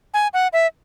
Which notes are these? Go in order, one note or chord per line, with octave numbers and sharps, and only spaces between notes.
G#5
F#5
E5